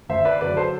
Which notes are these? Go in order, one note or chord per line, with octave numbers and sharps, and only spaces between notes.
D2 C5 E5
B4 D5
D3 F#3 B4 D5
A4 C5